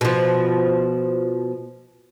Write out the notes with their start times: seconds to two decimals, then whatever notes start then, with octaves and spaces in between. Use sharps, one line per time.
0.01 B2 F3